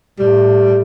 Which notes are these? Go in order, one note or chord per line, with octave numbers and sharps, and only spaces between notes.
A2 G3